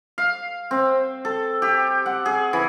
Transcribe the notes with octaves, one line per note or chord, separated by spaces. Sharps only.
F5
C4
A4
G4
F#5
G#4
E3